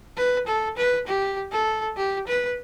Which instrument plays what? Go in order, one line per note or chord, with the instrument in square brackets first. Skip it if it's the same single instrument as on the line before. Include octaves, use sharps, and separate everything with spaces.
[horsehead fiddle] B4
A4
B4
G4
A4
G4
B4